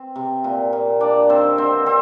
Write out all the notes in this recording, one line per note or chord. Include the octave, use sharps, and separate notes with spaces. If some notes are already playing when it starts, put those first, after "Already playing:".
Already playing: C4
C3
A#2
A#2
A#3 D4 D5
D#3 C4 C5
D3 C4 C5
C4 C5